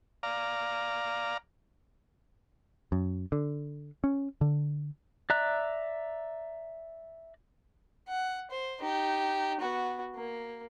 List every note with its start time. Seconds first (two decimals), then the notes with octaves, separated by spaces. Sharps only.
0.23 D5 F5 A#5
2.92 F#2
3.32 D3
4.04 C#4
4.41 D3
5.30 D5 E5 A#5 F#6
8.08 F#5
8.50 C5
8.80 D#4 G4
9.60 B3 F#4
10.15 A#3